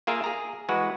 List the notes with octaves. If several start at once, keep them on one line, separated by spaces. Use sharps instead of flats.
A#3 F4 G#4 A#4 E5
G#4 A#5
E3 G#3 F#4 B4